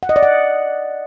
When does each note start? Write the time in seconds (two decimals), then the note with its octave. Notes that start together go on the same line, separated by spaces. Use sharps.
0.03 F#5
0.09 D#5
0.16 D5
0.23 F#5